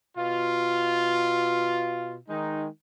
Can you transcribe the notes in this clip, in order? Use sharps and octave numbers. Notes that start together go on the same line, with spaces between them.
B2 F4
D#3 G#3 D#4